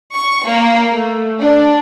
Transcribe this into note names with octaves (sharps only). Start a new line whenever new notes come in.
C#6
A#3
A3
D4